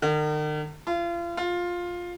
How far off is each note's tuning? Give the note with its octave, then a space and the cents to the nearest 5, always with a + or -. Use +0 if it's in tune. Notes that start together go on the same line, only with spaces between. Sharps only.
D#3 -45
F4 -35
F4 +10